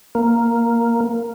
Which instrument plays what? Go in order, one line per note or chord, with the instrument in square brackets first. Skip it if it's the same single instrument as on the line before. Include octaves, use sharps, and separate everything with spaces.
[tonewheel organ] A#3